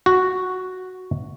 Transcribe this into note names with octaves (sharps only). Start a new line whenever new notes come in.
F#4